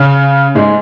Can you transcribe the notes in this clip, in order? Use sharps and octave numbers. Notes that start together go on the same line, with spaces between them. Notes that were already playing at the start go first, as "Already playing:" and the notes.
Already playing: C#3 C#4
G#2 G#3